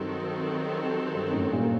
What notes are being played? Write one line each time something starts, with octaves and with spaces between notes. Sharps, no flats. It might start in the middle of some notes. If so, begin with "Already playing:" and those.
Already playing: G2 D#3 F#3 C4 F#4 A4
G2
F#2 A2
G2 A#2